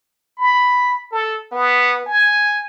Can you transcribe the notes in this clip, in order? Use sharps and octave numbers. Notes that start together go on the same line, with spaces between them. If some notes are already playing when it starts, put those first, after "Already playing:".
B5
A4
B3
G#5